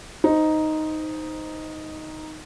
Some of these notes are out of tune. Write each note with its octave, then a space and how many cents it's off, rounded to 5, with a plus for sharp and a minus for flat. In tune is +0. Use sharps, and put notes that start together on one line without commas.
D#4 +0 C5 -10